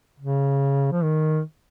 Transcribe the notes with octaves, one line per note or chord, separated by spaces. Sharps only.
C#3
F3
D#3